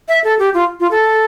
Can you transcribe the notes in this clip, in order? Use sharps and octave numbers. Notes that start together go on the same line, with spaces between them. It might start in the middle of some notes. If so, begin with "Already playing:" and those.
E5
A4
G4
F4
F4
A4